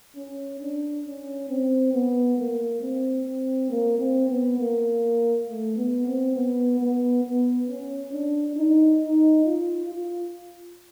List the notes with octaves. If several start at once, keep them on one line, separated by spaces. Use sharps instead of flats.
C#4
D4
C#4
C4
B3
A#3
C4
C4
A#3
C4
B3
A#3
A3
B3
C4
B3
B3
B3
C#4
D4
D#4
D#4
F4
F4